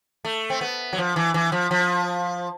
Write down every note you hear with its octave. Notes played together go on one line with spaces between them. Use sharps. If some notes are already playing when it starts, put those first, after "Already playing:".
A3
C4
B3
F#3
F3
E3
E3
F3
F3